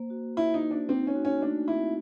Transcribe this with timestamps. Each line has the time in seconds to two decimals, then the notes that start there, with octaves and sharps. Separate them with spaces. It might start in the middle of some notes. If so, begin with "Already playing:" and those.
Already playing: A#3 C5
0.10 F#4
0.37 A#3 E4
0.54 D#4
0.62 A#3
0.71 D4
0.89 C4 D#4
1.07 C#4
1.15 F#4
1.25 C#4
1.41 A3 D4
1.68 C4 E4